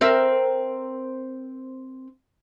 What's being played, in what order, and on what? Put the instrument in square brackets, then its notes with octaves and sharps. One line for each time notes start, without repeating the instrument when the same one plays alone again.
[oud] C4 A#4 E5